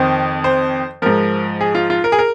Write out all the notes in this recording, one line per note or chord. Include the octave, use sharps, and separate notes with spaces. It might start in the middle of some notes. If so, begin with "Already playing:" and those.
Already playing: F2 D#3 C5
C5
G#2 F3 A#4
G#4
F4
F4
A#4
G#4
A#4